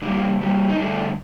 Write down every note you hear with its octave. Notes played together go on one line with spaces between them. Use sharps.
C3 G3 A#3 D4
C3 G3 A#3
D#4
G2 D3 A3 D4